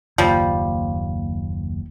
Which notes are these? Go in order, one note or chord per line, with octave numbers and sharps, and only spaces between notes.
F#1 D#2 F3 G3